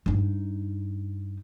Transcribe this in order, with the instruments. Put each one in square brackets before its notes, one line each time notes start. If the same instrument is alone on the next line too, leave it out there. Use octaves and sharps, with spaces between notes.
[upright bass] G2 D#4